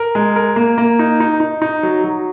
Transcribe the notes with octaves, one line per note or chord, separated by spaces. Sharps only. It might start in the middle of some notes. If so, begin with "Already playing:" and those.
Already playing: A#4
G#3
A#4
A#3
A#3
D#4
D#4
D#4
D#4
F#3
F#3